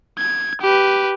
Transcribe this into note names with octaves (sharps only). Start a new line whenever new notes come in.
G#6
G4 B4